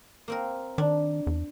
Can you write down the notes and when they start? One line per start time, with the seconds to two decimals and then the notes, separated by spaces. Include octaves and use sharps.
0.28 A#3 C4 A#4
0.78 D#3 D4
1.27 E2